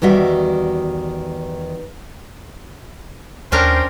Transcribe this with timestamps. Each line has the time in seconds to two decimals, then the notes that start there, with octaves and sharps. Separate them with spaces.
0.02 E2 D#3 G3 F#4 E5
3.52 D#2 C#4 D4 A#4 C5 G5